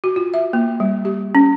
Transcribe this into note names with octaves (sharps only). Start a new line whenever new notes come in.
F#4
F4
E5
A#3
G3
G4
C#4